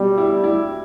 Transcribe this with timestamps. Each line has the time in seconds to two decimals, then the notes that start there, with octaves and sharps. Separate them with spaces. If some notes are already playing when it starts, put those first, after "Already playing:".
Already playing: B2 G3
0.18 E4
0.44 E4